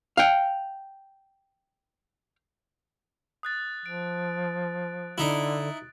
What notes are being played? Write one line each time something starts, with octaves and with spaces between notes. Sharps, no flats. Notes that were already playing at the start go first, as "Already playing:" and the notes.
F5 G5
D#6 F#6 A6
F3 D7
D3 D#4 E4